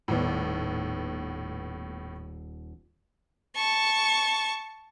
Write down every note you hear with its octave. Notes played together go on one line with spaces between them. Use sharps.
D#1 A2 B3 D#7
A5 C#6